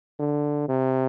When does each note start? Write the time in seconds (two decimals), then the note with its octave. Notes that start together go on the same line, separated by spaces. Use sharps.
0.19 D3
0.68 C3